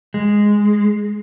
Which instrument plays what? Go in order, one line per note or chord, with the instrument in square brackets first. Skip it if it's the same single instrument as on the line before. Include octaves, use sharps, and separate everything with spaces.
[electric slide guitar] G#3